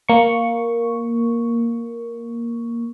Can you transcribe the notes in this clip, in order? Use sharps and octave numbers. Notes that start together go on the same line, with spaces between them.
A#3 C#6